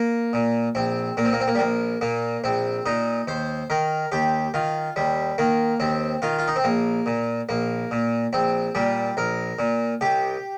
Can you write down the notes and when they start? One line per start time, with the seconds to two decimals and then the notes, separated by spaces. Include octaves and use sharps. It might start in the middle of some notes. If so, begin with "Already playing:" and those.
Already playing: A#3
0.33 A#2
0.75 A#1 C4
1.17 A#2 A#3
1.25 C4
1.33 A#3
1.40 C4
1.48 A#3
1.55 G3
1.59 A#1 A#3
2.01 A#2 A#3
2.44 A#1 C4
2.86 A#2 D#4
3.28 D#2 C5
3.70 D#3 A#4
4.12 D#2 G4
4.54 D#3 F4
4.96 D#2 G3
5.38 D#3 A#3
5.80 D#2 C4
6.22 D#3 F4
6.39 F4
6.48 D#4
6.56 C4
6.64 A#1 A#3
7.06 A#2
7.49 A#1 A#3
7.91 A#2
8.33 A#1 C4
8.75 A#2 G3
9.17 A#1 A#4
9.59 A#2
10.01 C2 G4